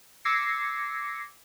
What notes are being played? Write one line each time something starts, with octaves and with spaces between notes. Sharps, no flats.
D6 E6 G#6 A#6 C7 C#7